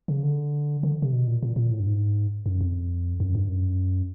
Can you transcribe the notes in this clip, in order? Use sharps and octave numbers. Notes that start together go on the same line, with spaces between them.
C#3
D3
D3
C3
B2
A#2
A#2
A#2
A2
G2
G#2
F#2
F2
F#2
G2
F#2